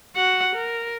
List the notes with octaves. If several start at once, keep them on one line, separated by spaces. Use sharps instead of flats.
F#4 F#5
A#4